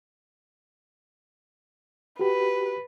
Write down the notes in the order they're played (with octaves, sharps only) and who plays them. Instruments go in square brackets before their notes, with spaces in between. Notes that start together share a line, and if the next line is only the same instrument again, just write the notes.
[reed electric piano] F#4 G4 [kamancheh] B4